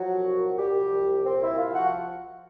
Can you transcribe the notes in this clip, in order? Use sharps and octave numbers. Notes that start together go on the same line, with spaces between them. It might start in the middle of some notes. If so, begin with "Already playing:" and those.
Already playing: F3 F#3 F#4
C2
A#2
C2 G3 G4
F3
C2
A#2 C4 C5
E4 E5
C2
F4 F5
F3
F#4 F#5